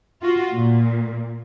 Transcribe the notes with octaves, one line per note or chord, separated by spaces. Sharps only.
F4 F#4
A#2